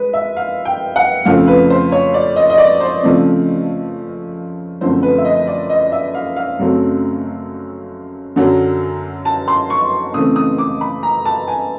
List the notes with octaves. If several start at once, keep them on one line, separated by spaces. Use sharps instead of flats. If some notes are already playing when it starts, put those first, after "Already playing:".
Already playing: G#3 B4
E5
F5
G5
F#5
F2 C#3 F3 A3 C4 F5
B4
C5
C#5
D5
D#5
D#5
D5
C5
C#3 F3 A3 C4
F#2 D3 F3 A3 C4 C5
B4
E5
D#5
D5
D#5
E5
F5
F5
F#2 C#3 F#3 A3 C4
F#2 D3 F#3
A5
C6
C#6
C#3 E3 A3 C4 D#6
D#6
D6
B5
A#5
A5
G#5